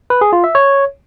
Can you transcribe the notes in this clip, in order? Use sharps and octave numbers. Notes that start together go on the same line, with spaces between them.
B4
G#4
F4
E5
C#5